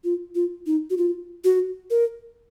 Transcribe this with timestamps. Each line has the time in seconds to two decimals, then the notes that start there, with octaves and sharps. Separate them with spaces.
0.04 F4
0.35 F4
0.66 D#4
0.90 F#4
0.97 F4
1.44 F#4
1.90 A#4